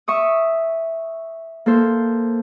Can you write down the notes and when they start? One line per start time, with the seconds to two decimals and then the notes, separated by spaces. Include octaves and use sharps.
0.08 E5 C#6 D#6
1.66 A#3 A4 C5